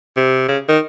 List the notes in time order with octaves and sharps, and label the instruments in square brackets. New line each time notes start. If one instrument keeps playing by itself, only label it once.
[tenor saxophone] C3
C#3
D#3